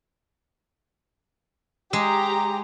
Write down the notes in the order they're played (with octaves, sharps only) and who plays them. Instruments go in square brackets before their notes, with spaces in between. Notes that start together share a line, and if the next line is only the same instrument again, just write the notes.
[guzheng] G#3 [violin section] G4 A#5